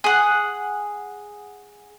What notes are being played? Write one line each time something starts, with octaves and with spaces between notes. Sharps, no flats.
G#4 F#5